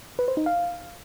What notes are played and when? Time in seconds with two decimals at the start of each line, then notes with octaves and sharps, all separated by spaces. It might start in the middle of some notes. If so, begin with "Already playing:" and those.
0.19 B4
0.28 C5
0.37 D#4
0.46 F5